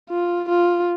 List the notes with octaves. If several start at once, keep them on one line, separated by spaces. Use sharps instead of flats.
F4
F4